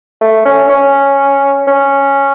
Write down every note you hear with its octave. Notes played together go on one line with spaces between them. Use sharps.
A3
C#4
C#4
C#4